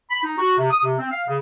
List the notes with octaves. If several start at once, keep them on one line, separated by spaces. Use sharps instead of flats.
B5
D#4
F#4
C3
D#6
C3
C4
F5
C#3